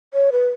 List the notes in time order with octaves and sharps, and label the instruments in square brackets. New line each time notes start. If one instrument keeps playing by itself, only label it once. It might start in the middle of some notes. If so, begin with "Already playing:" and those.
[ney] C#5
B4